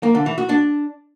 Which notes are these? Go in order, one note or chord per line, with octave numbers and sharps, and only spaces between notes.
A#3
D3
E3
F#4
D4